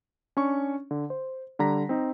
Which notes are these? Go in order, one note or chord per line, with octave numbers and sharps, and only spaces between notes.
C#4 D4 C#6
D3
C5
D3 G3 A#5 A#6 B6
C4 D#4